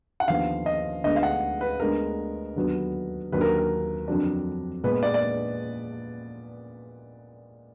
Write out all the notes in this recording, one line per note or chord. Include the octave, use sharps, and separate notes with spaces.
F#5
D#2 D3 F3 B3 F5
D#5
D2 D3 G#3 B3 D#5
F5
F#5
B4
D2 D3 G#3 B3 A#4
D#2 D3 F#3 B3
D#2 D3 F#3 A#3 D4 B4
A#4
A#4
F2 D3 F#3 D4
A#2 G#3 B3 B4
D5
D5